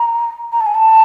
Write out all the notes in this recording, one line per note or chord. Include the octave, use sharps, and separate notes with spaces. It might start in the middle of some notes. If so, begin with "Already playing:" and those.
Already playing: A#5
A#5
A5
G#5
A5